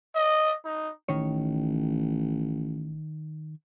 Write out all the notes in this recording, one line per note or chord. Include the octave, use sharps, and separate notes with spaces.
D#5
D#4
A1 D#3 C#5